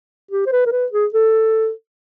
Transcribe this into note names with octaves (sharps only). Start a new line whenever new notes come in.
G4
C5
B4
A#4
B4
G#4
A4